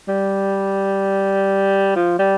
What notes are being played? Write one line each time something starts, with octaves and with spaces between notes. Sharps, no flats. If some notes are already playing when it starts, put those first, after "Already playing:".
G3
F3
G3